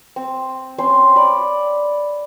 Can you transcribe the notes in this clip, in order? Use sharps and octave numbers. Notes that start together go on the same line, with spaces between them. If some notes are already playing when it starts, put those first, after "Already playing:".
C4
C4 C#4 C5 C6
D5 B5